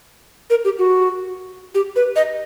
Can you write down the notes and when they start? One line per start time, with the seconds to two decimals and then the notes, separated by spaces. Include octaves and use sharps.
0.50 A#4
0.65 G4
0.79 F#4
1.75 G4
1.96 B4
2.16 D#5